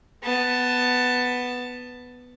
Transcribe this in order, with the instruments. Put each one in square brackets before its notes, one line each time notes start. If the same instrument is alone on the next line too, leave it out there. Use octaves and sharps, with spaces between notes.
[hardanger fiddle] B3 A5